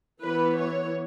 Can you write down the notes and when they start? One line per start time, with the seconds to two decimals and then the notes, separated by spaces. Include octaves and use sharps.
0.21 E3 B3 B4
0.56 C#5